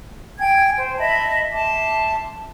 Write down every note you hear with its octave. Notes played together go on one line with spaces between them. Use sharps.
G5 G#5 G#6
C5
D#5 E5 A5 B5
E5 A5 C6 D6